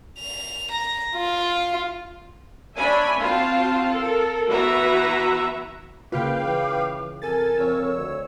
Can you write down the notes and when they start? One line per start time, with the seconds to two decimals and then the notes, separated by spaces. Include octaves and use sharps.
0.19 F7
0.72 A#5
1.16 F4
2.76 D4 C#5 E5 G#5 B5
3.19 C4 F4 F#4 C5 F5 A5
3.91 A4 A#4
4.48 E3 B3 F#4 B4 E5 A#5
6.12 C#3 A#3 F4 B4 F5 G5 D6
6.45 E3
7.22 F2 A4 A#4 G#5 A6
7.58 F2 C#5 E6
7.96 D2